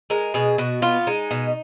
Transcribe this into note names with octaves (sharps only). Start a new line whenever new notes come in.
G#3 A#4
B2 G#4
B2 F#4
B3 F4
G#3 D#4
B2